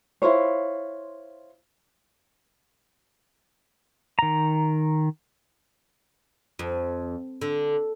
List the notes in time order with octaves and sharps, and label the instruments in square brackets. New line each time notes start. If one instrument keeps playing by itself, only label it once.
[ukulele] E4 F4 C5 C#5
[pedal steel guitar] D#3 A#5
[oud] F2
D3